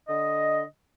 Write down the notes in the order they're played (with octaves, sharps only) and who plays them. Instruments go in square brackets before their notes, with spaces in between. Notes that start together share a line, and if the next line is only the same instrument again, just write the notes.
[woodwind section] D3 D#5